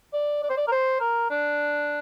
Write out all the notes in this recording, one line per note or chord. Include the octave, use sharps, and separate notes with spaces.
D5
D5
C5
D5
A#4
C5
A#4
D4